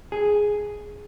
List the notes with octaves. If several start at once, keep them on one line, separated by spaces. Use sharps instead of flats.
G#4